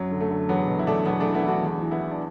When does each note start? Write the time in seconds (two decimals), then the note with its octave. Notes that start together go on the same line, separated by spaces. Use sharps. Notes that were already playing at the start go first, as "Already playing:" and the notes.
Already playing: F#2 F#3
0.11 D3
0.20 A3
0.30 D3
0.49 E2 F#3 B3
0.68 B2
0.79 E4
0.87 B2 A3 D4
1.05 E2 F#3 B3
1.20 E3 A3 D4
1.34 B3 E4
1.44 E3 D4 F#4
1.63 E2
1.82 E3
1.91 B3 E4
2.00 E3
2.11 D4